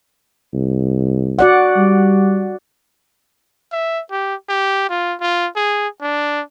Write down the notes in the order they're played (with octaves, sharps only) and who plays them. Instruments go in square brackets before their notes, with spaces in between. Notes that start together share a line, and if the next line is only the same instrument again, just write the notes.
[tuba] C2
[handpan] F#4 D5 F#5
[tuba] G3
[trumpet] E5
G4
G4
F4
F4
G#4
D4